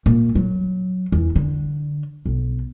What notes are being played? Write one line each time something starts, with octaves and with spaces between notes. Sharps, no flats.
A#2
F#3
E2
D3
B1